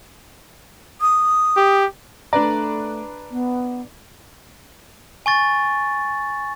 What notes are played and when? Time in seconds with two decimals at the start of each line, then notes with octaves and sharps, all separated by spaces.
1.01 D#6
1.57 G4
2.33 A3 D4 B4 D5 A#5
3.31 B3
5.26 G#5 C#6 A6